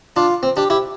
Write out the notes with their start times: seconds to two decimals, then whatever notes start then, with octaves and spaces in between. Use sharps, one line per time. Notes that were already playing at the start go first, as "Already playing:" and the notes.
0.16 D4 F4
0.43 C4
0.57 D4 G4
0.70 E4 G4